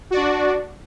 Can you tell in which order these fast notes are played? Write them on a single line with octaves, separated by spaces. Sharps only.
F#4 D5 D4